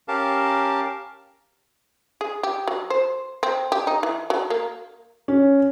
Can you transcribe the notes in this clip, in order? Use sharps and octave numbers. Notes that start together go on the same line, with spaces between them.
C#4 G4 A#4 F5 A5
G#4
G4
F#3
C5
C4
G4
D#4
E3
F#3
A#3
C#4